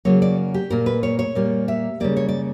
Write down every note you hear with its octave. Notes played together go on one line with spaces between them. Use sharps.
C#3 F#3 A#3 C#5
D5
G4
A#2 A#3 A#4
B4
C#5
C#5
A#2 G3 A#3
E5
C#3 G3 A#3 D5
C#5
D5